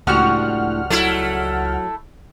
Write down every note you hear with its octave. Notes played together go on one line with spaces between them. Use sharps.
C#2 A2 F3 G3 D4 F#4 F#5 F6
F#3 A3 E4